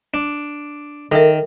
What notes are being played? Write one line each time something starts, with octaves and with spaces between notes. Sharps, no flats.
D4
D#3 A4 A#4 E5